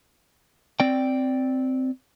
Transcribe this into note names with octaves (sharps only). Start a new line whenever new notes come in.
C4 D5 G5